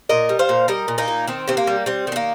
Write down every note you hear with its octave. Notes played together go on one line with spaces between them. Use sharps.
A#2 A#4 D#5
G3
C5 F5
A#2
G3 A#4 D#5
A#2
A#3 D#4
A#2
D#3 C4
C3 C4
A#3
G3
G3 C4
D#3 C4
A#3